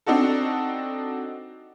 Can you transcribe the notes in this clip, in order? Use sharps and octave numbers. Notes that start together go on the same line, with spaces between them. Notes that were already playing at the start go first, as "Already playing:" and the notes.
C4 D4 D#4 F#4 A4